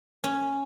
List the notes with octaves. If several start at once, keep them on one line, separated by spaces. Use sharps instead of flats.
C#4